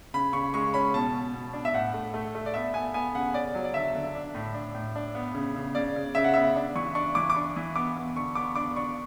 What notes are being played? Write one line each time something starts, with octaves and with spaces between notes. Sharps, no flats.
C#3 B5
C#3 C#6
G#3 C#6
C#4 B5
B2 A5
B2
B2
D4
E5
A2 F#5
A3
A3
A3
D5
B3 E5
B3 G#5
B3 G#5
C#3 F#5
C#4 D5
F#3
D5
D3 E5
D3
D4
A2
D4
A2
D4
B3
C#3
C#3
C#3 D5
C#3
C#3 E5
F#5
B3 E5
D4
E3 C#6
D4 C#6
E3 D6
D6
D4 C#6
E3
B3 D6
B3
D3 C#6
B3 D6
D4 D6
D4 C#6